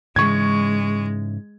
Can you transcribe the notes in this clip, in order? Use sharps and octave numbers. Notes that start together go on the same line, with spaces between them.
G#2 C#3 E3 G#3 C#6 G#6